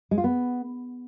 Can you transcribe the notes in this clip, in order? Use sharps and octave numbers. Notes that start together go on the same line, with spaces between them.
G#3
F4
B3